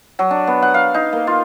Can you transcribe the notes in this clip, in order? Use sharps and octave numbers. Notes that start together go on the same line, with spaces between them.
F#3
D4
B3
F#5
F5
D#4
A#3
F4